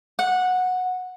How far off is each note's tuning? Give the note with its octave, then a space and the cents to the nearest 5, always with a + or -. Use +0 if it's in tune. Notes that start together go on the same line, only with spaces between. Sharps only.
F#5 -15